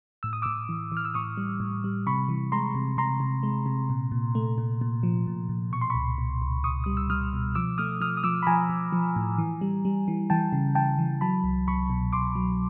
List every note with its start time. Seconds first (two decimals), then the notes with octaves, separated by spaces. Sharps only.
0.23 A2 E6
0.33 D#6
0.42 A2 D6 E6
0.69 E3
0.92 E3 F6
1.05 E6
1.14 A2 C#6 D#6
1.37 G3
1.60 A2
1.84 G3
2.07 C3 B5 C#6
2.29 E3
2.52 G#3 A#5 C6
2.75 C3
2.97 C3 A#5 C6
3.20 C3
3.43 G#3
3.66 C3
3.89 A#2
4.12 A#2
4.35 A3
4.58 A#2
4.81 A#2
5.03 F3
5.27 A#2
5.49 A#2
5.72 B2 C#6
5.81 C6
5.90 C#2 B5 C#6
6.18 B2
6.42 C#2
6.64 C#2 C#6 D#6
6.84 G3 D#6
6.97 E6
7.10 G3 D#6 F6
7.33 B2
7.55 F3 D6 E6
7.78 A3 D#6 F6
8.01 F3 D#6 F6
8.17 D#6
8.24 F3 D6 E6
8.42 B5
8.47 F3 G#5 A#5
8.70 F3
8.93 F3
9.16 A2
9.38 E3
9.61 G3
9.85 G3
10.08 E3
10.30 E3 G5 A5
10.52 C#3
10.75 E3 G5 A5
10.98 E3
11.21 F#3 A5 B5
11.44 C2
11.68 C2 B5 C#6
11.90 B2
12.13 C2 C6 D6
12.35 F#3